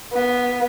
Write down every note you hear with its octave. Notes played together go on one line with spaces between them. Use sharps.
B3